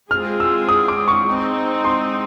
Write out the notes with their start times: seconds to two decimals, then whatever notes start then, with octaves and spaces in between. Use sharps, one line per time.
0.11 G#3 C4 F4 G#4 F6
0.40 E6
0.69 D#6
0.88 D6
1.08 C#6
1.28 G#3 C4 D#4
1.84 C6